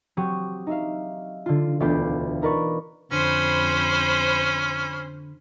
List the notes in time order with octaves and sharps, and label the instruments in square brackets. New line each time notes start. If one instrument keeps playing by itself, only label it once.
[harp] F#3 C4 G4 C#6 D#6 F#6
D#4 E5 F5
D3 F4
E1 D2 B3 F4 D5 G6
D#4 A#4 B4 D5 C#6
[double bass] F2 [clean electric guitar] D3 [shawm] C#4 [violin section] C5 B5